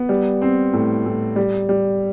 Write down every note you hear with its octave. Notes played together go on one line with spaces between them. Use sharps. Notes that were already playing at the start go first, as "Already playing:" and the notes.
Already playing: B3
G3
C4
A2
A2
G3
G3